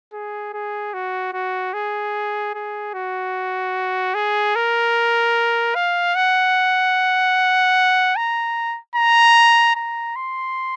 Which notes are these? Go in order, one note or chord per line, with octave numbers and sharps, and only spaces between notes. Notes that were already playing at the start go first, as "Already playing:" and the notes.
G#4
G#4
F#4
F#4
G#4
G#4
F#4
G#4
A#4
F5
F#5
A#5
A#5
A#5
C6